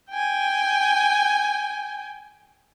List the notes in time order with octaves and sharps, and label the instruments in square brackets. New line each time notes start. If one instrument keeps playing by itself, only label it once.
[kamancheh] G5 G#5